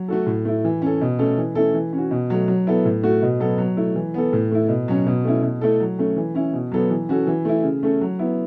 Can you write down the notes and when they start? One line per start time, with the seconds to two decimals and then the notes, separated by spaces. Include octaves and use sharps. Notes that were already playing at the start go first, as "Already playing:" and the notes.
Already playing: F#3
0.08 A3 F#4 A4
0.26 A2
0.45 A3 E4
0.64 E3
0.82 C#4 A4
1.01 B2
1.19 A3 C#4 A4
1.38 E3
1.55 A3 C#4 E4 A4
1.74 E3
1.93 C#4
1.98 F#4
2.11 B2
2.30 F#3 A3
2.48 F#3
2.67 B3 E4 A4
2.85 A2
3.03 A3 F#4
3.22 B2
3.40 F#3 B3 A4
3.58 F#3
3.77 A3 E4
3.96 E3
4.14 B3 A4
4.33 A2
4.51 A3 E4
4.68 B2
4.88 F#3 C#4
5.07 B2
5.24 A3 C#4 E4
5.43 B2
5.61 A3 E4 A4
5.80 F#3
5.99 A3 C#4
6.17 E3
6.35 C#4 E4
6.53 B2
6.72 F#3 B3 A4
6.90 E3
7.09 C#4 F#4 A4
7.27 E3
7.45 A3 E4
7.63 C#3
7.83 A3 C#4 A4
8.01 F#3
8.19 B3 E4